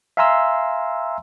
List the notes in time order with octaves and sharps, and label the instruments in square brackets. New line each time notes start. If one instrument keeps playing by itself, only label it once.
[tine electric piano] E5 F5 G#5 A#5 C6 E6